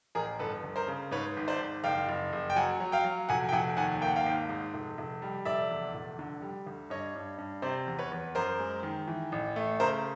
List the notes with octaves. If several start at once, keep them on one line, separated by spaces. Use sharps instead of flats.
A1 G#4 A#4
G1 A4 B4
G1
A#4 C5
C#3
G#2 B4 C#5
G#1
C5 D5
G#1
F#1 F5 G5
F#1
F#1
G5
F#3 F#5 G#5
F#3
F5 G5
F#3
F1 F#5 G#5
G5
F1 F#5 G#5
D#2 F#5 G#5
A#3 G5
F#5
F5 G5
G#1
G#2
F1
F1
G3
F1 D5 E5
E2
F1
D3
G3
D2
G2 C#5 D#5
G2
G2
C3 C5 D5
E2
B4 C#5
E2
F#2 A#4 C5
G#3
D#3
E3
A1
A3
C#3 A#4 C5